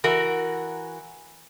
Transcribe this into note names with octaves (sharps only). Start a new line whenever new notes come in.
E3 F#4 A#4